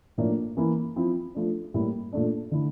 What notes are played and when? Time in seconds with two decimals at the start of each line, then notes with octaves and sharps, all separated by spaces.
0.18 A2 F3 A#3 D4
0.57 E3 A#3 E4
0.96 F3 C4 E4
1.35 F3 A3 D4
1.74 A2 G3 A#3 E4
2.13 A#2 A3 D4
2.51 D3 A3 E4